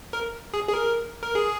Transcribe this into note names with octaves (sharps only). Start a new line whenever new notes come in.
A#4
G#4
G#4
A#4
A#4
G#4